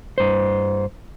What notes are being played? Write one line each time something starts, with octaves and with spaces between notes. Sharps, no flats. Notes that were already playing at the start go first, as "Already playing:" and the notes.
G2 C5